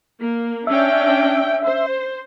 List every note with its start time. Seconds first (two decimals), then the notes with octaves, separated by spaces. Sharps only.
0.20 A#3
0.67 C#4 D4 E5 G5
1.63 C5